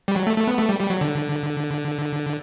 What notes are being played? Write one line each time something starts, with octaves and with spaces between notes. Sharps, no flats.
G3
F#3
A3
A3
B3
A3
G3
G3
F#3
D3